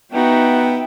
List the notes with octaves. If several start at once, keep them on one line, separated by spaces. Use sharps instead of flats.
B3 D#4 F#4 E5 G5